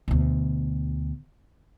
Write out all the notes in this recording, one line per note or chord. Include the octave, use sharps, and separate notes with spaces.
D2 B2